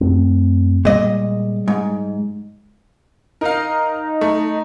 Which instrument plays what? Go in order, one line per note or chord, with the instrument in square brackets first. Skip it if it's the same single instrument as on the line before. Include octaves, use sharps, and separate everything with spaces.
[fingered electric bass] F#2 A3 C4
[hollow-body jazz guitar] A#2 D#5 [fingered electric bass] G3 G#3
[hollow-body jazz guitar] G#2
[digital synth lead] D#4 [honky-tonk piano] A#4 F5
[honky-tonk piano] A3